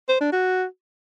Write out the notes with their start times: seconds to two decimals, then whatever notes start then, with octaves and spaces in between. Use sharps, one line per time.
0.09 C5
0.20 D4
0.32 F#4